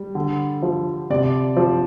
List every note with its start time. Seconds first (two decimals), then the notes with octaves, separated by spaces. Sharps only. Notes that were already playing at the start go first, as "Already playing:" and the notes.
Already playing: G3
0.15 D3
0.63 F3
1.10 C3 D5
1.57 F3